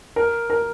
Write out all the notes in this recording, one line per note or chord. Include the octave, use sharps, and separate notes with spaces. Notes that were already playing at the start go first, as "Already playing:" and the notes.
A#4
A#4